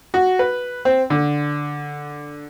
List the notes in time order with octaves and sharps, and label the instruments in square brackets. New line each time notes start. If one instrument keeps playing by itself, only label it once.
[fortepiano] F#4
B4
C4
D3